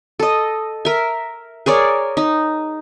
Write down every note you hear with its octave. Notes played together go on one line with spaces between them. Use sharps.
A4 D#5
A#4 E5
G#4 A#4 C#5 D5
D#4